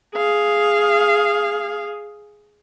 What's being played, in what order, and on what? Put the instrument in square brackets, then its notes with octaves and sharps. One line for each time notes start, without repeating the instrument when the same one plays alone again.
[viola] G#4 F5